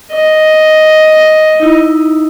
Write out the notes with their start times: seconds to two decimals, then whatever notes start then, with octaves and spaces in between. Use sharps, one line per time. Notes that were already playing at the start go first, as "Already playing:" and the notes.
0.11 D#5
1.60 D#4 E4